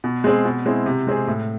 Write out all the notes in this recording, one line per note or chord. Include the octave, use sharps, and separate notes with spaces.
B2
G#3 C4 G#4
B2
G#3 C4 E4
C3
G#3 C4 G#4
A2